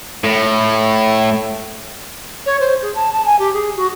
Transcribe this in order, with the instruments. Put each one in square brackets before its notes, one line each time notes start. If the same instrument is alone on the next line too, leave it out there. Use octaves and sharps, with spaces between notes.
[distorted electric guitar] A2
[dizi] C#5
C5
G#4
A5
A5
G#5
G4
G#4
F#4